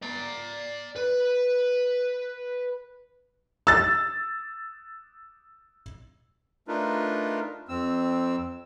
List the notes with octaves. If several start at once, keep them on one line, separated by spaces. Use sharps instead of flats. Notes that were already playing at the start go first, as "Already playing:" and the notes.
D5 A#5
B4
E6 A6
A3 D4 D#4 F4 A#4 B4
F2 C4 E6